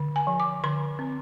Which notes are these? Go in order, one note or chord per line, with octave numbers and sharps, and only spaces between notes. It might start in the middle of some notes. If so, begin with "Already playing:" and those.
Already playing: D3
G#5
F3
D6
D3 C6
C4